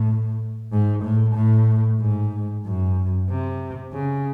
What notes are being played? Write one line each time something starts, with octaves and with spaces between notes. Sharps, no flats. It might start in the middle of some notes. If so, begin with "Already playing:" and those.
Already playing: A2
G#2
A2
A2
G#2
F#2
C3
C#3